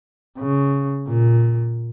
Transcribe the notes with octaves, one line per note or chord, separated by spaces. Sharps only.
C#3
A#2